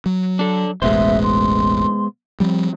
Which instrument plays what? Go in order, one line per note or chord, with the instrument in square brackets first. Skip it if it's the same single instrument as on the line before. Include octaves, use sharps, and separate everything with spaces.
[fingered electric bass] F#3
[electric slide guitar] D4 A4
[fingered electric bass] E1 A1 [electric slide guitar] G#3 B3 C5 [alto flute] E5
[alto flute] C6
[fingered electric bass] F3 G3 [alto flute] C4